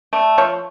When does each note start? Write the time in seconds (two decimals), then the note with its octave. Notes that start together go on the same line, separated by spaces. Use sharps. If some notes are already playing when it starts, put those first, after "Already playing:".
0.13 A3 D5
0.38 F3 C#5